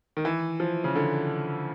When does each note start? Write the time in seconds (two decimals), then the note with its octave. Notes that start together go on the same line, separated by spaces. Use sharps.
0.17 D#3
0.25 E3
0.60 F3
0.84 C#3
0.95 D3